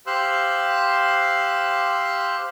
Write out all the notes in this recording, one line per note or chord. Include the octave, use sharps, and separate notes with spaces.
G4 C5 F5 C6 E6 F#6